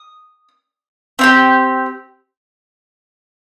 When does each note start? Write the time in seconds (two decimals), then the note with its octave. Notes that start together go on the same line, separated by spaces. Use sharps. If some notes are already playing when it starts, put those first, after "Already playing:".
Already playing: D#6
1.19 C4 D#4 G4